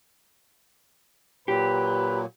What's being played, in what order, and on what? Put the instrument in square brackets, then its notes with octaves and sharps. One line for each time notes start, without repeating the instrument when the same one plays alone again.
[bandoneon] A#2 F#3 [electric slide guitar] G4 [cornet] B4